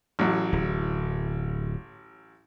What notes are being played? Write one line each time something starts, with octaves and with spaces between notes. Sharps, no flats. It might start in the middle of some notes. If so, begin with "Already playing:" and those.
A1 F#3
D1